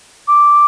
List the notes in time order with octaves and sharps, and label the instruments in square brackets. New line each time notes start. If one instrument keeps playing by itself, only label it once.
[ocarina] D6